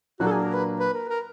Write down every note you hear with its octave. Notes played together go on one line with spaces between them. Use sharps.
A#2 F#3 A#3 D4 F#4
A4
G#4
A#4
B4
B4
A#4
A#4